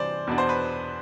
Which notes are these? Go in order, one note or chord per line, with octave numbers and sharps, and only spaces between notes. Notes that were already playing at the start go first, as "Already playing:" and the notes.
Already playing: C3 E3 G3 D4 C5 D5
E2 B2 B3 D4
C5
B4